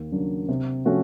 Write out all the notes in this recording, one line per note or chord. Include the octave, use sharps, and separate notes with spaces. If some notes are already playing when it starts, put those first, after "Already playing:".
Already playing: D#2
C#3 F#3 A#3 D4
C3
F3 A3 C#4 F#4